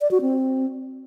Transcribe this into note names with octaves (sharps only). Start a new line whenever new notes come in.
D5
F#4
C4